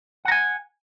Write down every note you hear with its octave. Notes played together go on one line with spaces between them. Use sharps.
F#5 G#5 A#5